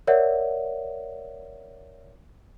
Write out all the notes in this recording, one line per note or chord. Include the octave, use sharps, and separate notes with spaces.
A#4 C#5 D5 E5 F#5